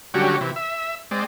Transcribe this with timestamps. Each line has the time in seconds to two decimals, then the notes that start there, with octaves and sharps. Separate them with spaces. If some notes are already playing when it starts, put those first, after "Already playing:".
0.14 D3 F#3 G3 C#4 F#4 G4
0.41 C3 E3
0.56 E5
1.11 G#3 C4 D5